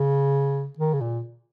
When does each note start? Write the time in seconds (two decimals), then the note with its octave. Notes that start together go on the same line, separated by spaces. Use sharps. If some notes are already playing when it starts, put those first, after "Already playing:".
Already playing: C#3
0.79 D#3
0.93 C#3
1.01 A#2